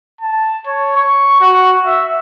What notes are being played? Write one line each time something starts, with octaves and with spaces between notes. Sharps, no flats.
A5
C#5
C#6
F#4
E5